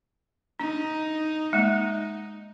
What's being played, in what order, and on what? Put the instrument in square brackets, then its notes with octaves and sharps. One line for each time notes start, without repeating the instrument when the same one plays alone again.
[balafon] D4 [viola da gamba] D#4
[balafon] G#3 A#3 [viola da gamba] D#4